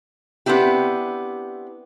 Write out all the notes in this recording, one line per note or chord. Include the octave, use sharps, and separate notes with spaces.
B3 C4 D4 E4 G4